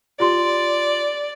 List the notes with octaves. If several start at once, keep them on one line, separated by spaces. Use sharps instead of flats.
F4 G4 D5 C6